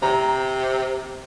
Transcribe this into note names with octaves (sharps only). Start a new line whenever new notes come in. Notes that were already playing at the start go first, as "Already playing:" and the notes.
C3 A#5